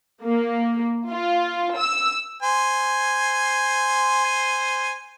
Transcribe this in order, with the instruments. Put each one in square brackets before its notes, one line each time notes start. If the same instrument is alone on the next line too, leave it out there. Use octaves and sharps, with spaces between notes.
[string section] A#3
F4
E6
[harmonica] C5 G#5